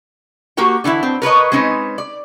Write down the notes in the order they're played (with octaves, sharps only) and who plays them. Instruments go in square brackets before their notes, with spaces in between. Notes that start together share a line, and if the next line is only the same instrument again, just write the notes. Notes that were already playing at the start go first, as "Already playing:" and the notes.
[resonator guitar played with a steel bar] A#3 F#4 G4 A#4 G5
D3 E3 D#4 E4
C4
A#4 B4 C#5 D#5
G#3 C4 C#4 D#4 B4
D5